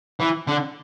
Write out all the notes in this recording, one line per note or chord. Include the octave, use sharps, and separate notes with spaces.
E3
D3